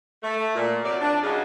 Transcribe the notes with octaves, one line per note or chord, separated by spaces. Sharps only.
A3
A#2
C3 F#3 D5
D4
G2 C#3 D#4 F4 F#4 G#4